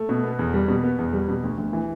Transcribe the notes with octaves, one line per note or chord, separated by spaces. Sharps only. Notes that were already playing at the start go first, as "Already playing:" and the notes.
Already playing: A3
B2
B3
E2
G3
B2
B3
E2
G3
B2
D2
D2
E3